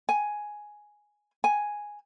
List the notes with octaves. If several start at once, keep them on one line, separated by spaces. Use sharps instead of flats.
G#5
G#5